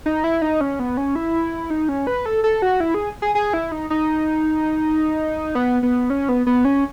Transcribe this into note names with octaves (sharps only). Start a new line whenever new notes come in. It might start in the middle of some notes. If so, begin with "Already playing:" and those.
D#4
E4
D#4
C#4
B3
C#4
E4
D#4
C#4
B4
A4
A4
F#4
E4
G#4
G#4
G#4
E4
D#4
D#4
B3
B3
C#4
B3
B3
C#4